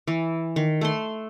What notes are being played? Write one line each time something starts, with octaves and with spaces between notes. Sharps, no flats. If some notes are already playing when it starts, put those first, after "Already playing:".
E3
D#3
A3 C6